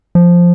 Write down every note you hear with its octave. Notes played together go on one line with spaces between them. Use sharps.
F3